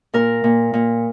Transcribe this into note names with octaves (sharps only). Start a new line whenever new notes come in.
A#2 A#4
A#2
A#2